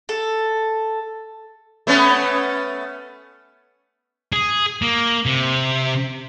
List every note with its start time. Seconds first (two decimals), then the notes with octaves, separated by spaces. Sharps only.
0.09 A4
1.87 A3 B3 C#4
4.33 G#4
4.82 A#3
5.26 C3